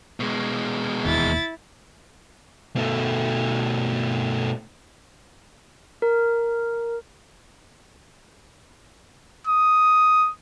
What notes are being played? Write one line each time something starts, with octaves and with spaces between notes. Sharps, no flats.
B2 G#3
E1 D#2 D#3 E4 A6
B2 A3
A#4
D#6